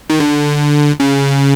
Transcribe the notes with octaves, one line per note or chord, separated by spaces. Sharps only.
D#3
D3
C#3